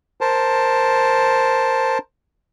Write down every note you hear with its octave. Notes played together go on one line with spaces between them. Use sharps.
A#4 C5 A5